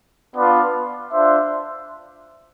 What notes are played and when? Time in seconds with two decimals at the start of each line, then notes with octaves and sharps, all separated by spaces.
0.35 B3 D4 F4 B4 D5
1.12 D4 F4 C5 E5